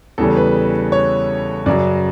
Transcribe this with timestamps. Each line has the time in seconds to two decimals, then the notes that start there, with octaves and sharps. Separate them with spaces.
0.18 E2 C#3 G3 C#4 A4
0.37 B4
0.92 C#5
1.66 F#2 C#3 F#3 D5